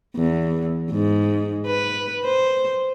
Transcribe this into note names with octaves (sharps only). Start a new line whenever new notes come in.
E2
G#2
B4
C5